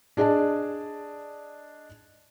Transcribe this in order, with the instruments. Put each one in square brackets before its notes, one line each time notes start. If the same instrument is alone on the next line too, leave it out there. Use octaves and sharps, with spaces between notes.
[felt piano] D4 G#4 D5 D#5 A5